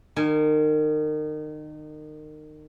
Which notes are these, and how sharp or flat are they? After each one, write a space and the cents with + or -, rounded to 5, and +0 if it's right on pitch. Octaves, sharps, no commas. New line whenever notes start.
D#3 -30 G#5 +0